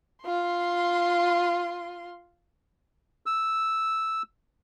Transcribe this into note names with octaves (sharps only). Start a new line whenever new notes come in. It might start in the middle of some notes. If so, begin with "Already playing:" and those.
F4 C6
E6